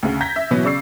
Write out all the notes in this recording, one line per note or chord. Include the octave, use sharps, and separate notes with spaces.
D2 C#3
A#5 G6 G#6 A#6 B6
E5
B2 E3 F#3 B3
C#3 D5 C#6 E6 C7